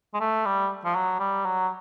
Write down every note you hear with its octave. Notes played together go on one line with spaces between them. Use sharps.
G#3
A3
G3
F3
F#3
G3
F#3